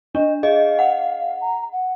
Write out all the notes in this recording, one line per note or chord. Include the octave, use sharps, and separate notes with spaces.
D4 D#5
G#4 D#5 F5
F#5
A#5
F#5